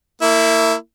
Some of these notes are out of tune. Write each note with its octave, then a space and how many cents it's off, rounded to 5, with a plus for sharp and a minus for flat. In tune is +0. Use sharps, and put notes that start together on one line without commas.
A#3 -35 E4 +0